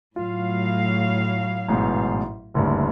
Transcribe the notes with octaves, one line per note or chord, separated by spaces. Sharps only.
A2 F#3 F4 F5
A1 G#2 B2
F#1 D2 G2